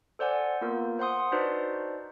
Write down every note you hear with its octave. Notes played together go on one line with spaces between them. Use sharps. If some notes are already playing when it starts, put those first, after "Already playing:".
A4 C5 D5 F#5 G#5
A#3 B3 F4 A#4
C5 F#5 C6 D#6
D4 D#4 F#4 B4 C5 D5